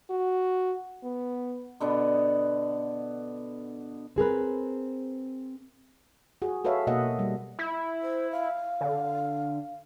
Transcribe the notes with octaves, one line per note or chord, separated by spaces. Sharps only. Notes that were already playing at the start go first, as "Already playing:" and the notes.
F#4
B3
B2 D3 B3 D4
C4 G#4 A#4 B4
F#4 G#4
F#4 A4 B4 C#5 E5 F5
B2 A#3 D#5 E5 F#5
G3
E4
C5
F5
D3